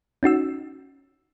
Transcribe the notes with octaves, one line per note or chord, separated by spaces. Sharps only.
C#4 D#4 F#4 E6